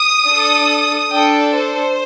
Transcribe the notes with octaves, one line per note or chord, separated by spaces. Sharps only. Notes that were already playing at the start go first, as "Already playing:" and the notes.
Already playing: D#6
D4 A4
D4 A4 G5
C5